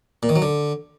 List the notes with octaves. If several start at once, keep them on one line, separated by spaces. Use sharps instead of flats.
A#2
D#3
F#3
D3